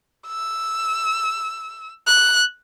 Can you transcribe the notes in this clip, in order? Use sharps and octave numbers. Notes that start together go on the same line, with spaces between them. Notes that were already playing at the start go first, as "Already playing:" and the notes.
E6
F#6